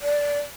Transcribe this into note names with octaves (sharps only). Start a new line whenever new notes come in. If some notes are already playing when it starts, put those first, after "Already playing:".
D5